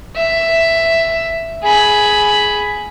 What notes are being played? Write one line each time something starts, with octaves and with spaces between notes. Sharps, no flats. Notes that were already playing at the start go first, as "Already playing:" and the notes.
E5
G#4 B5